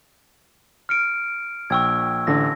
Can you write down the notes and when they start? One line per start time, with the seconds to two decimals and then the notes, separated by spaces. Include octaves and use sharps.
0.89 F6 C#7 D7
1.70 A#1 G5 C#6 E6 G#6
2.27 A1 D3 A#6